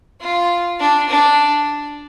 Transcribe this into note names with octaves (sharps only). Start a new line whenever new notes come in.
F4
D4
D4